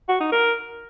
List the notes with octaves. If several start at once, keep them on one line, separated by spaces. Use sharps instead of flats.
F#4
D#4
A#4